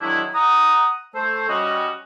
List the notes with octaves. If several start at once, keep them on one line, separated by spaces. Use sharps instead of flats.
D#3 F#3 G#3 D4 E4
F#5 A#5 D#6
A3 A4 C5
G3 C#4 F#4 D#5